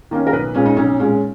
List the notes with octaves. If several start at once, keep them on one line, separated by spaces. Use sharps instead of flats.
D#3 A#3 C#4
A#4
B1 B4
A#2 G#3 C#4
D#4
B1 C#4
A#2 G#3 C#4